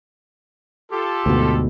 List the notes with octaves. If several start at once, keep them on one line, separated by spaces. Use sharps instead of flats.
F4 G4 A4
D2 G#2 B2